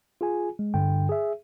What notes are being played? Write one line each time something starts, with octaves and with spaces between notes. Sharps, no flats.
F4 G#4 G#5
G#3
G2 D3 G5
G#4 E5